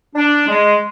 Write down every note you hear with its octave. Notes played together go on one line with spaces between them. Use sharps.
D4
G#3